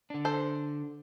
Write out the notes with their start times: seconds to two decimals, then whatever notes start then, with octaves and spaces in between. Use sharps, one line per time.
0.10 D3 D4
0.25 A4 C5